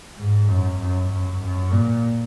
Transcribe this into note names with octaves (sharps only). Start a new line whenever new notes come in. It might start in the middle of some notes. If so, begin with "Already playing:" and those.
G#2
F#2
F#2
F#2
F#2
A#2